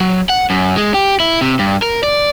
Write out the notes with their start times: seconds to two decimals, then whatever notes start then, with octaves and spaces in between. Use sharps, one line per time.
0.01 F#3
0.29 F#5
0.50 F#2
0.77 G#3
0.94 G4
1.20 E4
1.41 C3
1.59 G2
1.82 A#4
2.03 D5